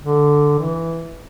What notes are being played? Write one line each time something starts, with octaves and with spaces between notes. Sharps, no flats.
D3
E3